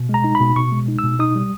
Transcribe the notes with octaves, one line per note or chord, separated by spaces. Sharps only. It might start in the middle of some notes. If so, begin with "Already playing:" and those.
Already playing: B2
G#3 A#5
D#4
B5
B2
B2 C#6
G#3
D#4
E6
B2
D#4 D#6
G3